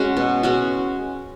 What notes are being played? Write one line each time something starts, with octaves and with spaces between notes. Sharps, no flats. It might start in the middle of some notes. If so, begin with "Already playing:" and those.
Already playing: G#3 C#4 F#4
B2
G#3 C#4 F#4